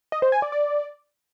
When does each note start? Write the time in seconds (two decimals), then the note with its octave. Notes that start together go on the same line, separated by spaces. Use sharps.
0.12 D#5
0.22 C5
0.32 G#5
0.42 D5
0.52 D5